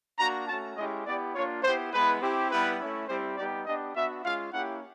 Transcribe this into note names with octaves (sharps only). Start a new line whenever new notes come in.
A#3 D4 F#4 A#5
A3 C#4 F#4 A5
G#3 C#4 E4 G4 D#5
B3 E4 G4 D5
A#3 D4 F4 C#5
B3 E4 G4 C5
G#3 B3 E4 B4
C4 E4 G4
G3 B3 E4 G4 B4
A3 C#4 E4
G3 C4 E4 G4 C5
G3 B3 D#4 G4 D5
B3 D4 G4 D#5
B3 D4 F#4 E5
G#3 C#4 F4 F5
A#3 C#4 E4 G4 F#5